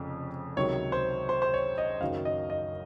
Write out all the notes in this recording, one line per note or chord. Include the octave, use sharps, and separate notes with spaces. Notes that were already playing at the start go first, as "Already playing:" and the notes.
Already playing: F1 F2 C#3
C#2 C3 D#3 F#3 C#5
C5
C5
C5
C#5
D#5
F#1 F#2 D#3 F#3 F5
D#5
D#5